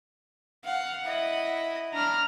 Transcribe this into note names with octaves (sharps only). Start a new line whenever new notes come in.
F5 F#5
E4 D#5
D4 A#5 B5 F6